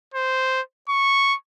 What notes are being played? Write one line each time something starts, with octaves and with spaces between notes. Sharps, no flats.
C5
C#6